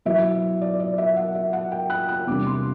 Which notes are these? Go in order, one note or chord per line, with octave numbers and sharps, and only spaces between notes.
B2 F#3 B3 E4 E5
D5
D5
E5
F#5
E5
F#5
G5
F#6
F#6
E2 C3 G3 D4 D6
C6